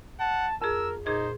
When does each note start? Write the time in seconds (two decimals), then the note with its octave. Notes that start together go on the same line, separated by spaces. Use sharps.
0.20 F#5 A5
0.62 F2 G#4 A#4 E6
1.06 A#2 D#4 G#4 C5 G#6